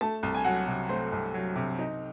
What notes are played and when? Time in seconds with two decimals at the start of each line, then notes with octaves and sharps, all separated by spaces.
0.01 A3 A5
0.23 C2
0.35 G#5
0.45 F#3 F#5
0.68 C3
0.89 A3 C5
1.12 C2
1.34 F#3
1.56 C3
1.79 D#4